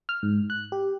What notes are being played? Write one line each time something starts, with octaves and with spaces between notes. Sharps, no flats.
F6
G#2
F#6
G4